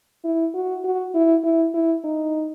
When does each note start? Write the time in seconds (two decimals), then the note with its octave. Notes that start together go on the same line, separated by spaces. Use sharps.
0.24 E4
0.54 F#4
0.84 F#4
1.14 E4
1.44 E4
1.74 E4
2.04 D#4